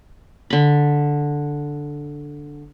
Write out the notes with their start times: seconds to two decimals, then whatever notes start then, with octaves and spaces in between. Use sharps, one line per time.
0.50 D3 B5